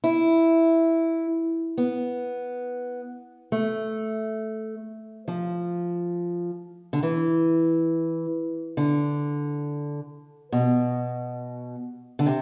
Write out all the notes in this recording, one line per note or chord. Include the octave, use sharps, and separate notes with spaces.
E4
B3
A3
F3
D3
E3
D3
B2
D3
C3